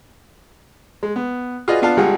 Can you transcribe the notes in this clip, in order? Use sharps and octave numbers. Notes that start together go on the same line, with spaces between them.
G#3
B3
F4 F#4 G#4 B4 D5 D#5
B3 D4 F4 F5 A5
G#1 G3 F4 G#4 F#5